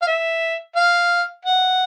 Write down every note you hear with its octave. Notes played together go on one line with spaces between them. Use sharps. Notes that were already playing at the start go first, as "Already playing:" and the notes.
F5
E5
F5
F#5